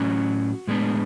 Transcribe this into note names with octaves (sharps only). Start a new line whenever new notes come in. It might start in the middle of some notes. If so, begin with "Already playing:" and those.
Already playing: A2 F#3 C#4 F#4
A2 G#3 B3 D4